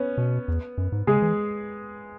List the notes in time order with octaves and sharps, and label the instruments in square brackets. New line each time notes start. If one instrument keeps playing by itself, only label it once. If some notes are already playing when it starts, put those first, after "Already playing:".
Already playing: [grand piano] B3 C#4
[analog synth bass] B2
E2
F#2
G#2
[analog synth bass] C#3 [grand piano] G#3 G#4
[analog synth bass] E3